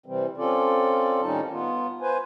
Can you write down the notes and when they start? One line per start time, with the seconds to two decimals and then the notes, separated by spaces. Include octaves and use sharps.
0.06 C3 E3 G3 C4
0.37 C4 C#4 F4 A4 D5
1.22 A2 D#3 G3 C#4 D#4 A5
1.51 B3 F4
2.01 B4 C5 G#5